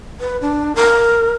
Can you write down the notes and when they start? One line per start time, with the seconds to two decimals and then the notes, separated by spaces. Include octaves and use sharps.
0.20 B4
0.41 D4
0.76 A#4